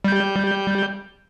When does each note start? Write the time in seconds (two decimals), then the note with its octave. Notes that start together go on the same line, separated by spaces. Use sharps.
0.04 G3 G6